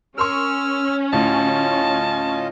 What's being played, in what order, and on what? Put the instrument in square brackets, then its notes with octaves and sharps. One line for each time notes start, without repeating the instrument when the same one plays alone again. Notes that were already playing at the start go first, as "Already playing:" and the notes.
[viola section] C#4 [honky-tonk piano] A#4 C6 C#6 [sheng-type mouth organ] E6 F6
[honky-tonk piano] D2 A2 [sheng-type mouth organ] F4 D#5 [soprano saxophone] A5